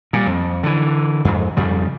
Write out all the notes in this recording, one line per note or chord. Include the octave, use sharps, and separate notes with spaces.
A#2 G3
F2
D3 E3
F2 G#2
F2 C#3 G3